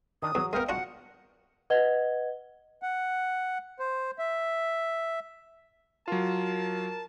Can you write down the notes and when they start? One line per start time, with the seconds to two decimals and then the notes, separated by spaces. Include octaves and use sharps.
0.22 D#3 D4 D#6
0.35 E2 F#3
0.53 G#3 B3 A#4 D#5 F5 G5
0.69 D4 F4 F#4 F#5
1.70 B4 D#5 F#5 G#6 G7
2.82 F#5
3.79 C5
4.19 E5
6.08 F#3 F4 A#4 A5